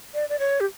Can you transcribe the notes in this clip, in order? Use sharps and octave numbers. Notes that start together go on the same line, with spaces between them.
D5
D5
C#5
G4